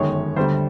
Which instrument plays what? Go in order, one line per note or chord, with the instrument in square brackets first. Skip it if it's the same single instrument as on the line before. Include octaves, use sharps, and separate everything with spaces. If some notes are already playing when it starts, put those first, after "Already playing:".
Already playing: [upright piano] G1 F#2 D#3 G#3 C#5
D2 D3 G3 C5